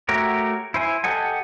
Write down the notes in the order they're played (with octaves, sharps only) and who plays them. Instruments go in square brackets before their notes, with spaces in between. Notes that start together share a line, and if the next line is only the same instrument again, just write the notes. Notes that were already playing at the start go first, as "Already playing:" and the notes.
[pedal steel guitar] A3 F#4 G4 A#4 C#5
E4 C5 G#5
G4 A4 D#5 F#5 G#5